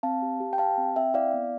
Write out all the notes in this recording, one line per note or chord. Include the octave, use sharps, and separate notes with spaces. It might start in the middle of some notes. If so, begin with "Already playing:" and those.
C4 F5 A5
G4
G4
G5
G4 F5 A5
C4
C4 E5 G5
E4 D5 F5
B3